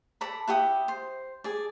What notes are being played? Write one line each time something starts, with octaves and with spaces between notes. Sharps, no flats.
A4 D5 A#5 B5
E4 G4 F#5 D#6
C5
G#4 D5